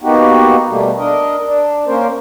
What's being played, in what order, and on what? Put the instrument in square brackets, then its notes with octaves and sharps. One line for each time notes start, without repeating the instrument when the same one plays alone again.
[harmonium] A#3 B3 D#4 F#4 G4
B2 G3 A3 A#3
D4 A#4 D#5
D4
A#3 C#4 A#4 C5